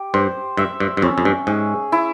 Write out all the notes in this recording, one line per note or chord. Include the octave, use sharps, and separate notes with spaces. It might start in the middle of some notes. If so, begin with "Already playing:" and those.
Already playing: G4
G2 C5
G2 E5
G2
G2
F2 C#4
F2
G2
G#2 G#4
E4